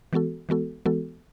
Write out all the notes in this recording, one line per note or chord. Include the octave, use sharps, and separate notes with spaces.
E3 G#3 B3 F#4 A4
E3 G#3 B3 F#4 A4
E3 G#3 B3 F#4 A4